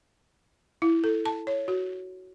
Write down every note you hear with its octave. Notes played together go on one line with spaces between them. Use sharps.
E4
A4
A5
C#5
F#4